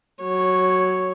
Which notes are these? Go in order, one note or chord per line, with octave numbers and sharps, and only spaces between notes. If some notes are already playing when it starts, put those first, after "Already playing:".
F#3 C#5